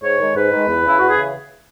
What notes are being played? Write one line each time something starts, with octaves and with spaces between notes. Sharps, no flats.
G#2 C#5
D#3 G#3
G#2 B4
D#3 G#3
E2
C#3 E3 E4
E2 F#4
G#4
C#3 E3